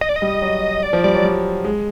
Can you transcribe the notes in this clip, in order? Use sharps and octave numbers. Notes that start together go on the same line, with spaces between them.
D#5
D5
D#5
G3
F#3
D5
F3
G3 D5
F#3
G3
G#3